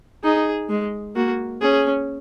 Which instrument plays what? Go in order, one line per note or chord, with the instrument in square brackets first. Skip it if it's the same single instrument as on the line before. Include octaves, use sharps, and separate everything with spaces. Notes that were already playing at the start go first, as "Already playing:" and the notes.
[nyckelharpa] D#4 [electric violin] G#4
[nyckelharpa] G#3
[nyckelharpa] A#3 [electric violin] F#4
[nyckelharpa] C#4 [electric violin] G#4